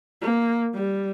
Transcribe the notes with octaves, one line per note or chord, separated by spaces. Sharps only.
A#3
G3